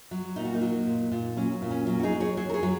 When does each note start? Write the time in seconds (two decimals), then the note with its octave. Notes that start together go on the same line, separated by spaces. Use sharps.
0.11 F#3
0.36 A#2 D#4
0.45 F#4
0.54 A#3 D#4
0.61 F#3
0.87 A#2
1.12 A#2
1.37 F#3 C#4
1.62 A#2
1.71 C#4
1.86 F#3 C#4
2.00 F#4
2.03 D#4 G#4
2.12 F#3
2.20 G#4 C#5
2.37 F#3 G#4 C#5
2.49 A#4
2.54 G#4 C#5
2.63 F#3